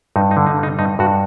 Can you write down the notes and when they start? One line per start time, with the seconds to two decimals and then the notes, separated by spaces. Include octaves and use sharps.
0.16 G2 D#4
0.31 D#4
0.37 D3
0.46 D#4
0.58 G3
0.63 D#4
0.79 G2 D#4
0.99 G2 F#4